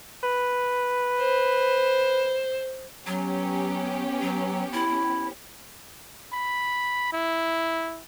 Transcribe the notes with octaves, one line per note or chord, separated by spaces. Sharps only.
B4
C5
F#3 B3 C#4 G4
F#3
E4
B5
E4